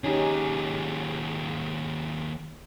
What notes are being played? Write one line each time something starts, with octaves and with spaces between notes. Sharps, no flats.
D#2 C#4 D#4 G4 G#4